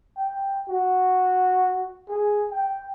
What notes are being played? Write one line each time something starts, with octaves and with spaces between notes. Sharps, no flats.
G5
F#4
G#4
G5